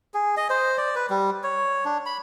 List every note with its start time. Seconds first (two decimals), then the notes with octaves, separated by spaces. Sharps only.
0.14 G#4
0.37 D#5
0.50 C5
0.78 D5
0.96 B4
1.10 G3
1.43 C#5
1.85 D4
2.06 B5